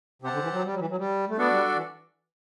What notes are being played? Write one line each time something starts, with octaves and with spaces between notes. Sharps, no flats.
C3 C4 G4 C5 F#5 A5
D3
E3
F#3
G3
F#3
E3
F#3
G3
A3
B3 D4 F#4 A4 D5
G3
E3